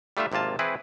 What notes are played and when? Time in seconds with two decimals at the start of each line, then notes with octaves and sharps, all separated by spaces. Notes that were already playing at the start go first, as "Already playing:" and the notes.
0.17 G3 A3 D4 F4 E5
0.32 G#1 C3 A#3 F4 A5
0.59 E3 C4 E4 G#4 B4